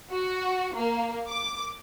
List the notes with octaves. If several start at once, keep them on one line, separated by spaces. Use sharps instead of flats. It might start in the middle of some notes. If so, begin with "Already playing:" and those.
F#4
A#3
D6